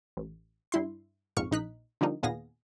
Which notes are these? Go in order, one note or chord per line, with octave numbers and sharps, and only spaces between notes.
A1
G2 E4 C6
A#1 F2 G#2 C#6 F6 C#7
A#1 D#4 F#6 B6
D3 F3 G3 A#3 D#4
D#2 A#2 B3 G#4 F5 A#6